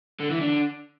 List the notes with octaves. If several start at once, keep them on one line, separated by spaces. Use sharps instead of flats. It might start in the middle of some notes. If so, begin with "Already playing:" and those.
D3
E3
D3